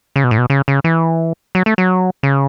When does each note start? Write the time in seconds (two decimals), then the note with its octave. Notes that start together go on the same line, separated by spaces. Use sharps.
0.16 C#3
0.24 B2
0.31 A2
0.38 B2
0.50 C#3
0.68 C#3
0.84 E3
1.55 F#3
1.66 A3
1.78 F#3
2.23 C#3